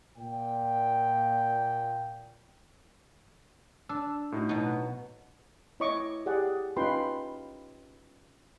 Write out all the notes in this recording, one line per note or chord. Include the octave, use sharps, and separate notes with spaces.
A#2 G5
D4 E6
A2 D#4 F#4
B2 F#3
E4 C#5 D#5 C#6 D6
G4 G#4 D5 F#5
C#4 D#4 F4 B4 G5 C6